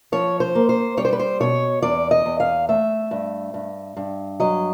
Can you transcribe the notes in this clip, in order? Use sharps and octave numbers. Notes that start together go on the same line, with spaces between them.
F3 C#5
C5
A#3
C5
G3 C#5
C5
B4
C5
B2 C#5
E2 D5
D#5
E2
F5
A3 E5
G2
G2
G2
F#3 D#5